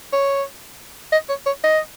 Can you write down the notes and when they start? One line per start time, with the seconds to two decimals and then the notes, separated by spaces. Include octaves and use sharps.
0.13 C#5
1.12 D#5
1.29 C#5
1.46 C#5
1.64 D#5